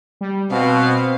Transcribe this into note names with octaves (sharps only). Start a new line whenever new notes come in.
G3
B2 C4 F5